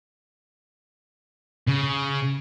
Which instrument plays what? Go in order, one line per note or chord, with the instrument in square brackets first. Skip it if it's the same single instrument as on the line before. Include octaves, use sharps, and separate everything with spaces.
[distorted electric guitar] C#3